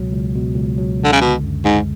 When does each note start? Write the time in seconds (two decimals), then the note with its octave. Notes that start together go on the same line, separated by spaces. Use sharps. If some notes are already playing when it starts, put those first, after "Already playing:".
Already playing: C#2 B2 F#3
0.12 C#2
0.35 B2
0.55 C#2
0.78 F#3
1.00 C#2 D3
1.12 C#3
1.21 B2 D3
1.44 F#2
1.65 G#2 G#3